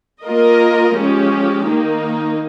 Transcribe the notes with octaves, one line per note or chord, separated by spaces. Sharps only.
A#3 F4 A#4 D#5
F3 G#3 C#4 G4
D#3 A#3 D#4